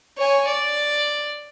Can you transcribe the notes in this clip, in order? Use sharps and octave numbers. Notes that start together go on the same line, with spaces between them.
C#5 G#5
D5